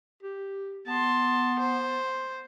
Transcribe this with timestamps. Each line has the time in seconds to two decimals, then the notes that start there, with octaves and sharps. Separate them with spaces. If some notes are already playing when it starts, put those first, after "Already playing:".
0.23 G4
0.87 B3 A5 C6
1.59 C5